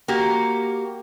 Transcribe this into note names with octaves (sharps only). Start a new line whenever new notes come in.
A#3 F#4 G4